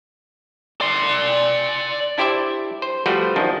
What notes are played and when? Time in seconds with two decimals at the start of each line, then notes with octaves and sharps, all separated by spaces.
0.81 D5 C6
2.18 D4 E4 G4 C5 D5 E5
2.82 C5
3.06 F3 G3 A3 F#4 B4 C5
3.36 F#2 D#3 F3 D4